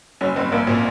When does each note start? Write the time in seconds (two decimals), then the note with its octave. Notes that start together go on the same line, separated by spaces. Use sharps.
0.21 F#1 C#4
0.36 F#1 C4
0.52 A#1 A#3
0.67 A#2 C4